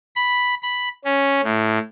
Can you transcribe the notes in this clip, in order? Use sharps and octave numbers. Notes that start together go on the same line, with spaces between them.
B5
B5
C#4
A2